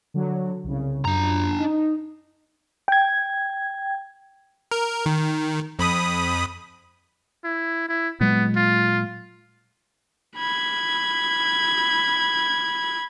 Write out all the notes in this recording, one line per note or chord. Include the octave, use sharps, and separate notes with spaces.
D3 F#3
C2 C#3
F#2 D4 A#5
D#4
G5 G#6
A#4
D#3
F2 B5 D#6
E4
E4
A#2 F#3 G#3 B3
F4
B5 G#6